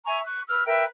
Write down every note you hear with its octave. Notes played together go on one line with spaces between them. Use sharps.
E5 G#5 A#5 C#6
C#6 F#6
B4 E6 F6
A#4 B4 E5 G5